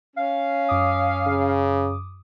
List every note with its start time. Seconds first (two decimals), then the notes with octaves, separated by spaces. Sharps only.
0.16 C#4 F5
0.69 F#2 D6 D#6
1.27 C#3